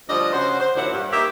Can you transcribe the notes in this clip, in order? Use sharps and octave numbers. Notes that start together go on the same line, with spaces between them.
D2 F3 G3 D4 D#5
C#3 C#4 F#4 C5
C5
D#2 A#2 F#3 D4 E4 F#5
G2
A#3 D#4 G4 E5